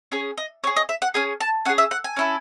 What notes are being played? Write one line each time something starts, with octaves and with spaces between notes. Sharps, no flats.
C#4 G#4 C#5
D#5
C#4 G#4 C#5
D#5
E5
F#5
C#4 G#4 G#5
A5
C#4 G#4 F#5
E5
F#5
G#5
C#4 E4 A4